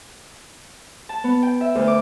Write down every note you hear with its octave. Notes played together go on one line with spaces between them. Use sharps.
A5
B3
G5
E5
D2
D6